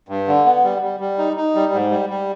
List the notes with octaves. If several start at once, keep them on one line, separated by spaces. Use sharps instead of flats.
G2
D3
B3
G3
G3
G3
D#4
D#4
G3
G#2
G3
G3